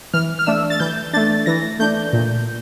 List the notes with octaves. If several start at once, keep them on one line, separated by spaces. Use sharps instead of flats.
E3 F6
F6
A3 D4 E6
A6
E3 G6
A3 D4 A6
E3 A#6
A3 D4 G6
A#2